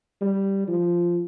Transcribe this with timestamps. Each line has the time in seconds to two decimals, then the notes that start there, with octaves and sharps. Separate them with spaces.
0.21 G3
0.68 F3